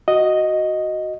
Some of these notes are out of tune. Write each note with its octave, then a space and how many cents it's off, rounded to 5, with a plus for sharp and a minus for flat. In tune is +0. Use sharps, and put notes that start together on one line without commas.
F#4 +0 D#5 +0